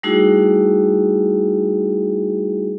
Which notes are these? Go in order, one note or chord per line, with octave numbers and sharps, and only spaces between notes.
G3 A3 D#4 E4 F#4 G#4